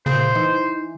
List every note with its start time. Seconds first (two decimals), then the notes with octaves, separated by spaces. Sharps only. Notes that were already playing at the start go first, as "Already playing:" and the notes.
0.06 A#2 C#3 C5
0.35 E3 D#4